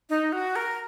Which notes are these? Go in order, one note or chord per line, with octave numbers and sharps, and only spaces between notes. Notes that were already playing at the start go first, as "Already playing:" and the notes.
D#4
F#4
A#4